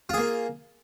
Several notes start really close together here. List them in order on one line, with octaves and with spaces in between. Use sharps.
F4 G#4 A#3